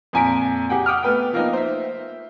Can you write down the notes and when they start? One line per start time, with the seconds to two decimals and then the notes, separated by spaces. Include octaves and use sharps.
0.13 F2 A#2 G#5 A#5 B6 D7
0.70 G4 G#4 F#5 G5
0.86 F#5 G5 D6 D#6 F6
1.03 A3 B3 B4 G5
1.33 F3 A#3 B3 D#4
1.53 C5 E5